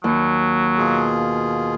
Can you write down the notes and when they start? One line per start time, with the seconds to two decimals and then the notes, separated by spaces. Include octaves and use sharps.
0.04 D#2 F#3
0.78 B2 F4 G#4